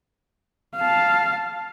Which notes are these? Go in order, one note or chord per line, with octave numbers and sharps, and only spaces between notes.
F5 A5